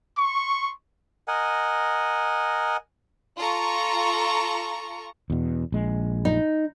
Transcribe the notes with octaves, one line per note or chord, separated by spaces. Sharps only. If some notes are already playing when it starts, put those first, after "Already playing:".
C6 C#6
A#4 D#5 F#5 G#5
F4 A4 A#5 C#6
E2 B2
A#1 G#3
D#4